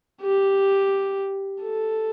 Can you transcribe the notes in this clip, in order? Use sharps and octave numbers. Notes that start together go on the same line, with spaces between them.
G4
A4